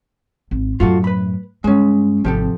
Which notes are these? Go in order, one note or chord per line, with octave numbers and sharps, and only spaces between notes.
G#1
F#2 A2 F4 F#4 A4
B4 B5
G2 G#3 C#4
G#1 C3 F3 G4 A4